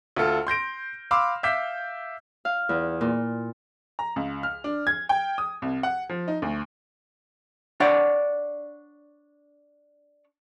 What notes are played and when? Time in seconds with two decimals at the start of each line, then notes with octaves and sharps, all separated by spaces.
0.16 D2 F4 A4 F6
0.47 C6 G6 A#6 D7
1.11 F5 B5 C6 D6 E6 F6
1.43 E5 F5 D6 E6 G6 B6
2.45 F5
2.69 E2
3.01 A#2
3.99 A#5
4.16 C#2
4.43 F6
4.64 D4
4.87 G#6
5.09 G5
5.38 D#6
5.62 C2
5.83 F#5
6.09 F3
6.28 D#4
6.42 D2
7.80 D4 C#5 D5 F#5